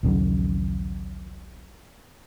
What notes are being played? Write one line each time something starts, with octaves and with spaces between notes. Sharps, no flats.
A#1 D#2 C#3 F#3